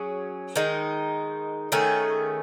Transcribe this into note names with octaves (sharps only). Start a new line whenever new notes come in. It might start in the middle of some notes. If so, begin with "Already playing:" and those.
Already playing: F#3 C#4 G#4
D#3 G#3 D#4
D#3 A3 C#4 G#4